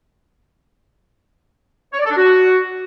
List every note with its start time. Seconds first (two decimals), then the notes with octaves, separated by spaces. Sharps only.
1.93 C#5
1.99 D5
2.05 A4
2.11 D4
2.17 F#4